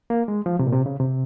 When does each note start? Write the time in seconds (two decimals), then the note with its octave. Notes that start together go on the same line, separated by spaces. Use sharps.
0.10 A#3
0.28 G#3
0.46 F3
0.59 C3
0.67 A#2
0.72 C3
0.86 C#3
1.00 C3